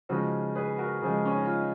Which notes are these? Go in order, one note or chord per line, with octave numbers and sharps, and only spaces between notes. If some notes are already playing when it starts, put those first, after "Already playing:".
C#3 F3 G#3 D#4 F#4
G#4 B4
F#4 A#4
C#3 F3 G#3 F4 G#4
C#4
D#4
F4
D#4